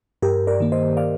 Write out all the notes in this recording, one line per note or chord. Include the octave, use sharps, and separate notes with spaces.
G2 G4 A#4
A#4 D5
D#3 A#3
C5 D#5
D5 F5